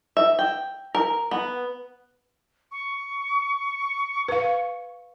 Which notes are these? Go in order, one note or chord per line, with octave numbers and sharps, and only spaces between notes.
E5
G5
A#4
B3
C#6
B4 F5